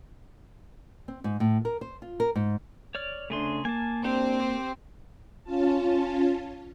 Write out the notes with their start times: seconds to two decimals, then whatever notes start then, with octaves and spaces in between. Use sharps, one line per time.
1.08 C4
1.24 G#2
1.40 A2
1.65 A#4
1.81 C5
2.02 F4
2.20 A#4
2.35 G#2
2.95 C#5 D5 F6
3.30 C#3 A3 D4 G#4 C6
3.65 A#3 G#5 A5
4.04 C4 D4 G4
4.40 G4 C5
5.44 C#4 F4 A5